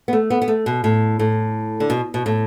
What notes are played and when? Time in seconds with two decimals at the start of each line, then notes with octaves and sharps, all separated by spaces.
0.08 B3
0.13 A3
0.30 B3
0.42 B3
0.48 A3
0.66 B2
0.84 A2
1.19 A2
1.80 D3
1.90 B2
2.14 B2
2.26 A2